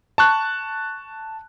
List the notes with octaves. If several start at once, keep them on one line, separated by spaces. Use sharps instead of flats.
A5 C#6 F#6